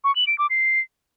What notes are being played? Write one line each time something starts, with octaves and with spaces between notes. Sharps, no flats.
C#6
F#7
D7
D6
C7